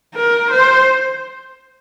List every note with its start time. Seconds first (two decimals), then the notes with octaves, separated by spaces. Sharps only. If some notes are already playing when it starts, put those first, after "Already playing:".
0.15 A#4
0.51 C5